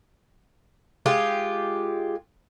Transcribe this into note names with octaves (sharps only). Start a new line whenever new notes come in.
G#3 F4 G4